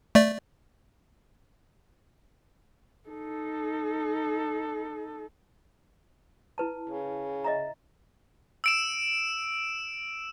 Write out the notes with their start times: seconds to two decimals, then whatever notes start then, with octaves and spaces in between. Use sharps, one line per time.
0.15 A3 D5
3.09 D#4 A4
6.58 E4 B4 A5
6.89 C#3
7.44 D#5 E5 A#5
8.64 E6 D7 E7